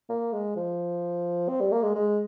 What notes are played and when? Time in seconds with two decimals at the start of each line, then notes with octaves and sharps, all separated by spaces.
0.09 A#3
0.33 G#3
0.56 F3
1.49 C4
1.61 G3
1.72 A#3
1.83 G#3
1.95 G#3